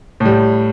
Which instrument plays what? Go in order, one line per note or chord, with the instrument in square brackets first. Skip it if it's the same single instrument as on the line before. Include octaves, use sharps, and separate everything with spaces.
[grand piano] A2 G3